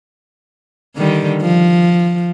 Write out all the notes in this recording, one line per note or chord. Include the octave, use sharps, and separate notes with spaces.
D3 D#3 G3
F3